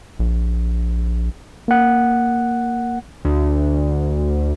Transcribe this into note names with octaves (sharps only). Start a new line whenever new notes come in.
A#1
A#3 F#5
D2